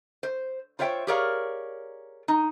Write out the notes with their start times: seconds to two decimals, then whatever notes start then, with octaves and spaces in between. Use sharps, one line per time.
0.23 C5
0.79 F4 C5 C#5 E5 G5
1.07 G4 G#4 A#4 C#5 D5 F5
2.28 D#4